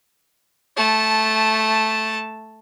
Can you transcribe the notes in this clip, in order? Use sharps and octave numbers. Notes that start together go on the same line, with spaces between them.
A3 A5